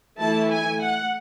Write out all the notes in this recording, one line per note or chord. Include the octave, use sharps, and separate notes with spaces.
E3 A3 E4 A5
G#5
F#5